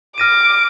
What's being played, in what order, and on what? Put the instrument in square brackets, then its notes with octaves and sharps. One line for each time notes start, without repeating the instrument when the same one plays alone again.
[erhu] D6 [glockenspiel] F6 A#6 D#7